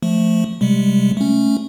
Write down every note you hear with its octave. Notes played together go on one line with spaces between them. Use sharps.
F3 A3
C3 G3 G#3
A3 C#4